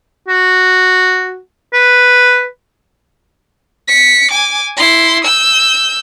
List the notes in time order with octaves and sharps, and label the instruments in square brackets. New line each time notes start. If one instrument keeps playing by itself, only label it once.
[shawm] F#4
B4
[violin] B6 C#7
G#5 D6
E4 C6
E6 G6